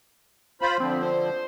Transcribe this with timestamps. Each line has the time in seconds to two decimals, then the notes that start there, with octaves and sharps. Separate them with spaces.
0.62 F4 C5 B5
0.80 D3 F3 C4
1.03 C5